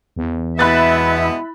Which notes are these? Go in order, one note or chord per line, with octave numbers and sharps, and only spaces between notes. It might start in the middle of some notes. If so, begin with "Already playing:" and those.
E2
B2 G#3 B3 E4 E5 B5 F#6 A6